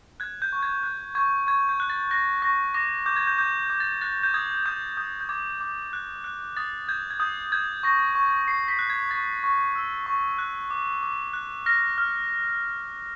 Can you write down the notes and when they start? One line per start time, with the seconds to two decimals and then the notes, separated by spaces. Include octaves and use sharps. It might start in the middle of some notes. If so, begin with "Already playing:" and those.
0.20 F#6 G#6
0.42 G6
0.53 C#6
0.63 G#6
0.83 F#6
1.15 C#6 G#6
1.47 C#6 G#6
1.69 G6
1.80 F#6
1.90 A6
2.11 F#6 A#6
2.36 A6
2.42 C#6 A#6
2.74 D6 A#6
3.06 D6 G6
3.16 G#6
3.27 G6
3.38 D6 G6
3.70 D6
3.80 A6
4.01 F#6 A6
4.23 G6
4.34 D#6 G#6
4.66 D#6 G6
4.97 D#6 G6
5.21 G6
5.29 D6 G#6
5.61 D6
5.93 F#6
6.24 F#6
6.57 D#6 A6
6.89 G6 G#6
7.11 G#6
7.20 D#6 G6
7.52 G6 G#6
7.83 C#6 A#6
8.15 C#6
8.47 C#6 C7
8.68 B6
8.79 F#6
8.90 G#6
9.11 C#6 A6
9.44 C#6
9.75 E6
10.06 C#6
10.38 F#6
10.71 D6
11.03 D6
11.33 F#6
11.66 F6 A#6
11.98 F6